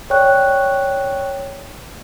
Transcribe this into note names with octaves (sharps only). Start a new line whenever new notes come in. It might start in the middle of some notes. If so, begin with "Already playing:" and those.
C#5 D5 G5 C#6 F#6